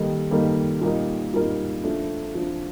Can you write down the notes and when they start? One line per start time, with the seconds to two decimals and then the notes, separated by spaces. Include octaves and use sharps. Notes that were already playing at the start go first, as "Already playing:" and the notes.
Already playing: D#3 G3 A#3 D#4 A4
0.31 D#3 G3 A#3 D#4 A4
0.81 A#2 G3 A#3 D#4 A#4
1.33 A#2 G3 A#3 D#4 A#4
1.84 F3 A3 D4
2.35 F3 A3 D4